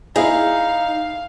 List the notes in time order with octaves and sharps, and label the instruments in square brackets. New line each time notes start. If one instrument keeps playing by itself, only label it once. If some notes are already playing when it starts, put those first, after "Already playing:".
[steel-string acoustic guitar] D#4 [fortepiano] E4 G#4 [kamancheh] F5